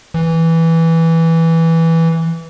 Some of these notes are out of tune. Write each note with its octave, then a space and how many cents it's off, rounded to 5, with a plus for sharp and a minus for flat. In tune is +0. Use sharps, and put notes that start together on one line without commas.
E3 -5